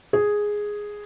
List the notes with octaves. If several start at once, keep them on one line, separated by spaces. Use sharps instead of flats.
G#4